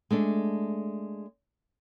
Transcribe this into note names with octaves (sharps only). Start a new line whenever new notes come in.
G#3 A3 D4